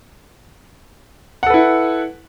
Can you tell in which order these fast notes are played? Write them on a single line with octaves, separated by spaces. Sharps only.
F#5 A4 B4 E4